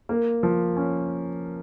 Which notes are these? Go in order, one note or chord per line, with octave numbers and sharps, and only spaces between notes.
A#3
F3
C#4